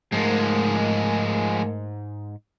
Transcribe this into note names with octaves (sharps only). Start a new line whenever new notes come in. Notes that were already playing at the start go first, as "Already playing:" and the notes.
G#2 F3 G#3 A3 A#4